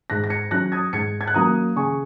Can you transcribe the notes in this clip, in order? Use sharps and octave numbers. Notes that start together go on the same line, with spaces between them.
G#2 F#6 A#6
A#6
G#6 C#7
F#3 C#4 F#6 A#6
D#6 G#6
G#2 G#6 C#7
G#6
F#6
F#3 A#3 C#4 A#5 D#6
C#3 G#5 C#6